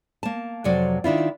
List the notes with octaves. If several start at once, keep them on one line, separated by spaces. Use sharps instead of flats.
A#3 A5
F2 C3 F#3 D5
D#3 D4 E4 F4